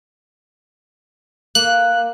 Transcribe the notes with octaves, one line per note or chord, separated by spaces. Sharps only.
A#3 F#6